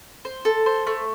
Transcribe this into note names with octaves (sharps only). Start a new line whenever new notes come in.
C5
A4
C5
A3